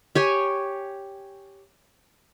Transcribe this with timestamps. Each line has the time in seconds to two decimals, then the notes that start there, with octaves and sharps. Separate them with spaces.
0.15 G4 C#5 G#5